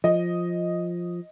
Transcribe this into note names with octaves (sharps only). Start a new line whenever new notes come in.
F3 D#5